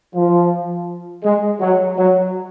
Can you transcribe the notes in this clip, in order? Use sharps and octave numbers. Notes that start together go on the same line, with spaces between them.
F3
G#3
F#3
F#3